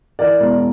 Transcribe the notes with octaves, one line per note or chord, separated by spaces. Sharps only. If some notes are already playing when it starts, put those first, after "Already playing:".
E3 A#4 D5
E1